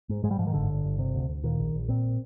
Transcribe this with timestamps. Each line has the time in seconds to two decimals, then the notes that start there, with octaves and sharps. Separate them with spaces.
0.09 G#2
0.24 G#2 G#3
0.31 G3
0.39 G#2 F3
0.47 D#3
0.54 G1 D3
0.69 G1
0.84 G1
0.99 C3
1.15 D2
1.28 D2
1.43 A#2 D#3
1.59 A#1
1.74 A#1
1.88 A#2 C4